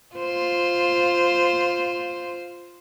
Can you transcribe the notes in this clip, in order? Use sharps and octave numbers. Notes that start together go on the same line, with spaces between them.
F4 C5